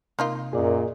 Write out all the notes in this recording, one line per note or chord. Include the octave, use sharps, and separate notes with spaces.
C3 A#3 D#4 F4
F#2 A#2 G#4 D5 D#5